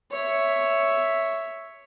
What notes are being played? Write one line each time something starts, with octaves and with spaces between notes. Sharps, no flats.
C#5 E5